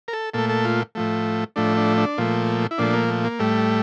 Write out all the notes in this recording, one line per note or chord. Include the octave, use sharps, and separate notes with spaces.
A#4
A4
A#2 A3 A4
A4
F4
A2 F3 A3
A2 F3 A3 D4
D4
D4
A#2 F3 A3
E4
A#2 F3 A3 D4
A#3
A3
A#3
A2 G3 A3